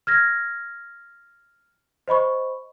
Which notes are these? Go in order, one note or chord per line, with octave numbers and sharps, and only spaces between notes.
F6 G#6 A#6
C5 D#5 B5 C#6